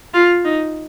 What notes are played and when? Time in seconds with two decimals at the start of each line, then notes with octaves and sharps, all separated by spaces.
0.14 F4
0.44 D#4